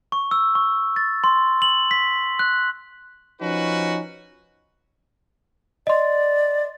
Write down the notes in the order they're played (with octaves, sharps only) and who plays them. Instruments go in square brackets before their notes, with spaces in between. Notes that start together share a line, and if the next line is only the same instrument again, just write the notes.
[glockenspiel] C#6
E6
C#6
A6
C6
F#7
B6
F#6
[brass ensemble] F3 C#4 D#4 F#4 B4
[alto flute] D5 [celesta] D#5 C6